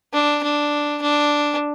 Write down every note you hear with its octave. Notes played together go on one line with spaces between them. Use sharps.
D4
D4
D4